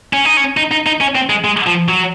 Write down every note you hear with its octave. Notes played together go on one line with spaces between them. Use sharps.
C#4
D#4
C#4
D#4
D#4
D#4
C#4
C4
G#3
G#3
F3
F#3